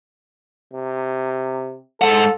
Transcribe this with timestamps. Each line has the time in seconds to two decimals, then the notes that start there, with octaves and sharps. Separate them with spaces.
0.73 C3
2.02 G#2 A4 F#5